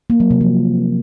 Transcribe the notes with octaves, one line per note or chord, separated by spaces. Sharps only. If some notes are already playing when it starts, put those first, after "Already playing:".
A#3
F#3
C3
F3